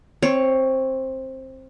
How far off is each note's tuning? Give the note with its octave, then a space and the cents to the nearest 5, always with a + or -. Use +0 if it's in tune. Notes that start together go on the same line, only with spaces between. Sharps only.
C4 +15 C#5 +0